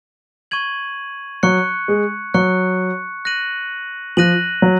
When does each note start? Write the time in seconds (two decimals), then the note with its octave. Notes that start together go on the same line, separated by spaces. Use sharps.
0.51 C#6 G#6 D#7 F#7
1.43 F#3 C#6 F#6 C#7
1.88 G#3
2.34 F#3 C#6 F#6 C#7
3.25 F#6 A#6 D#7 F#7
4.17 F3 F#6 A#6 D#7 F#7
4.62 F#3